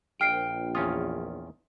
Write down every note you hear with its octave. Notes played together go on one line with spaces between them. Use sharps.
A#1 G5 F6 C7 D7
E2 C#4 F4 D#6